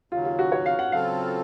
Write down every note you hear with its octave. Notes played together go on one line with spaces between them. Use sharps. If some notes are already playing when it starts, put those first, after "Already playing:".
D#2 C#3 F#3 F4
F4
F#4
C#5
F5
F#5
C#3 F#3 C4 F4 A4 F5